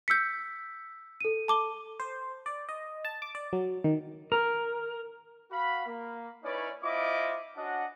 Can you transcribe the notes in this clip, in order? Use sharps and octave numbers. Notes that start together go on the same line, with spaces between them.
E6 G6 B6 C#7
A4 D#7
A5 D6 G7
C5
D5
D#5
A5
D6
D5
F#3
D#3
A#4
F#4 F5 B5
A#3
C#4 D#4 E4 B4 C#5 D5
C4 E4 F4 D#5 D6
C#4 D4 F#4 D#5 F#5